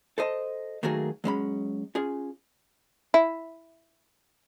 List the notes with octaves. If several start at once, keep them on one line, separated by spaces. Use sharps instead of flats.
A4 C5 D#5 A5
D#3 F#3 A3 A#3 F#4 G#4
F#3 G#3 C#4 B5
C#4 F4 G#4
E4